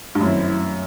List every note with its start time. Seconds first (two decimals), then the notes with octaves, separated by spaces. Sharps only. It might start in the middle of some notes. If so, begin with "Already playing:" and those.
0.15 G2
0.21 F#2 D#3 F#3 A3 C4 E4